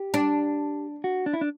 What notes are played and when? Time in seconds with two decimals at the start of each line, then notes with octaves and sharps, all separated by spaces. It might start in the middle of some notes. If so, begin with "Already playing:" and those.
Already playing: G4
0.14 D4
1.04 F#4
1.26 D4
1.33 E4
1.41 D4